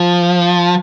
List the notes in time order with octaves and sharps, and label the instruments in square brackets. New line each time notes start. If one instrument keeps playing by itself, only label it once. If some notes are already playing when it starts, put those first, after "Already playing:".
Already playing: [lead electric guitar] F3